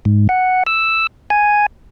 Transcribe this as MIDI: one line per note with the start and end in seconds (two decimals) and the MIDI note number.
0.05 0.28 44
0.29 0.63 78
0.67 1.07 88
1.30 1.66 80